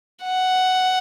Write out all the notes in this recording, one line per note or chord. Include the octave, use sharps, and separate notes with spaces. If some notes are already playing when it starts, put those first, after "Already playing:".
F#5